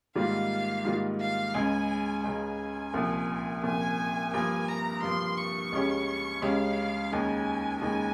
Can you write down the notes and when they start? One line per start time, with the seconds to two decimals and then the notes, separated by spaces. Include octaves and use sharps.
0.15 G#2 D#3 G3 A#3 F4 F5
0.85 G#2 D#3 G3 A#3 F4
1.20 F5
1.54 C#2 C#3 G#3 G#5
2.24 C#2 C#3 G#3 G#5
2.94 C2 A#2 F3
3.63 C2 A#2 F3 G#5
4.33 G2 F3 A#3 G#5
4.68 A#5
5.03 G2 F3 A#3 C6
5.37 C#6
5.72 C#2 C#3 G#3 C#4 G4
6.42 C#2 C#3 G#3 C#4 G4 F5
7.12 D#2 C#3 G#3 D#4 G#5
7.82 D#2 C#3 G#3 D#4 G#5